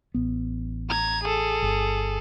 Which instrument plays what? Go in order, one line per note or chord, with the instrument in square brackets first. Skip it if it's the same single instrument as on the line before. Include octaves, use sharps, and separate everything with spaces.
[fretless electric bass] A1 B3
[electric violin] A#5 G#6
G#4 A4
[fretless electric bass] G1